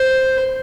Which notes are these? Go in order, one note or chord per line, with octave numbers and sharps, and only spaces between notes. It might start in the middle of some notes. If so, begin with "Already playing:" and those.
Already playing: C5